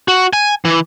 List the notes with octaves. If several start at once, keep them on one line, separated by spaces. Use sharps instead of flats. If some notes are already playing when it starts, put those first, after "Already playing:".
F#4
G#5
E3